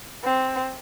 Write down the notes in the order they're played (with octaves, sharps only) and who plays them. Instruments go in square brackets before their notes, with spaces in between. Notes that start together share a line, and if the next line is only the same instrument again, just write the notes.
[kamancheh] C4